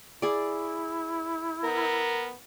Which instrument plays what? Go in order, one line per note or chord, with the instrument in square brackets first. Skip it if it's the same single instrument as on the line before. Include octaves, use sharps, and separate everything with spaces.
[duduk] E4 [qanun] G#4 D5
[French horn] B3 [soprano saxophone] A#4